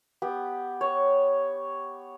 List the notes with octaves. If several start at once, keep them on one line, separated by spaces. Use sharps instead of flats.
B3 G4
C#5